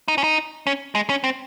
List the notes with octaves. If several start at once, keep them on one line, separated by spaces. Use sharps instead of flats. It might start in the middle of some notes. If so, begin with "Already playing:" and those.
D#4
C#4
D#4
C#4
G#3
C#4
C4